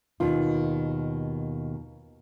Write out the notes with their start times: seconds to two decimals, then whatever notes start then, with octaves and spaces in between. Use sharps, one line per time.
0.20 D#2 B2 D#3 F4